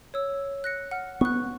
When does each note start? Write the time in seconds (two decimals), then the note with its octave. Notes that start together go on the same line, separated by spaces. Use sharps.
0.14 C#5 E6
0.64 F#6 A#6 C#7
0.91 F#5 F6
1.21 B3 C#6 F#6